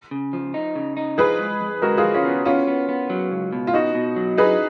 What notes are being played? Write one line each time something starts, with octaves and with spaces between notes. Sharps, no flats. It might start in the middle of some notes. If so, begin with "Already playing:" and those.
C#3
F3
D#4
C#3
D#4
F3 G#4 B4
G#3
F2
G#3 F#4 A#4
F4 G#4
F3
C#4 F4
B3
B3 C#4 F4
B3
B3
F#3
C#2
B2
F4
B2 D#4 F#4
B2
F#3
D#4 G#4 B4